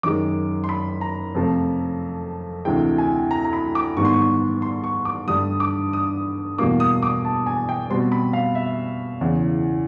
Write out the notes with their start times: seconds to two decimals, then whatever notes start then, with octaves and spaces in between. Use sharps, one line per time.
0.03 F#2 D#3 G#3 D6
0.64 C6
0.69 B5
1.01 A#5
1.35 F2 C3 F3 A3
2.65 D2 C3 E3 G#3 G5
2.98 G#5
3.31 A#5
3.45 A#5
3.53 B5
3.75 D6
3.97 G#2 D#3 G3 B3 C#6
4.05 C6
4.13 C#6
4.62 C6
4.84 C#6
5.05 D6
5.28 G2 D3 G3 D#6
5.60 D6
5.93 D#6
6.58 E2 B2 G3 A#3 D6
6.80 D#6
7.03 D6
7.25 A5
7.46 G#5
7.69 G5
7.90 B2 G3 C4 C6
8.12 B5
8.33 F5
8.55 E5
9.21 E2 C#3 E3